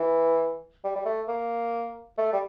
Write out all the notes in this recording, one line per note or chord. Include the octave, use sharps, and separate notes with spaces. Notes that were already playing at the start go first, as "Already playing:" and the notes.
Already playing: E3
G3
G3
A3
A#3
A3
G3